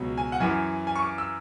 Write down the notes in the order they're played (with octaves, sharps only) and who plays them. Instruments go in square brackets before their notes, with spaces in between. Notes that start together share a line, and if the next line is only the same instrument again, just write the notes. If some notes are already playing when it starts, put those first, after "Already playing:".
Already playing: [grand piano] C#2 B2 F#3
G#5
F#5
F#2 E3 G#5
G#5
C#6
D6
E6